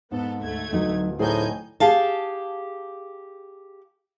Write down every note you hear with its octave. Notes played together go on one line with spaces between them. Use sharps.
G#2 B3 A4
D2 A3 G#6
D1 F#3 D#4
A2 D#4 G#4 C5 D5 G#5 G6
G4 G#4 F5 A5